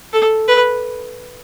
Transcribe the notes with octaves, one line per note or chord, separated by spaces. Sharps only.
A4
B4